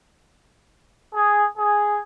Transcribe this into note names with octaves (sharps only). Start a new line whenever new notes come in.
G#4
G#4